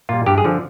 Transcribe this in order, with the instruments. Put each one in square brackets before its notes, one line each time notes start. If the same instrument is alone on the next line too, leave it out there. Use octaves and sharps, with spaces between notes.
[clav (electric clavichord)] A#2 G3 F4
G2 G4
G#4
D3 F3